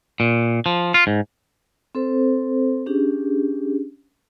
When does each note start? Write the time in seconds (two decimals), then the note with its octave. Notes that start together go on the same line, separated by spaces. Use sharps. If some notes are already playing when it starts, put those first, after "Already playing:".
0.20 A#2
0.66 F3
0.94 F4
1.07 G#2
1.95 C4 A4 C5
2.86 C#4 D4 G4 G#4